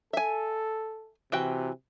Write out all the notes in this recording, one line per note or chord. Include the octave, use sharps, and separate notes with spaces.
A4 E5 G#5
C3 E3 F#4 G5